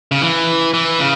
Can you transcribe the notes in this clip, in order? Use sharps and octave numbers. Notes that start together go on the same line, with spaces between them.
C#3
E3
E3
C#3